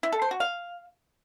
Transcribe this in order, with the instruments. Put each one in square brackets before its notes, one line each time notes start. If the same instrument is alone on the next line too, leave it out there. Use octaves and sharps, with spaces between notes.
[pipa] E4
A4
C5
F#4
F5